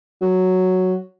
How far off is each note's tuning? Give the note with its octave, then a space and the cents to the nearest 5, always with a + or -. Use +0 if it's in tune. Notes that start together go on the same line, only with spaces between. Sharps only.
F#3 +0